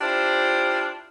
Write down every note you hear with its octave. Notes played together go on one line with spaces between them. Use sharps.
D4 E4 F4 G4 C5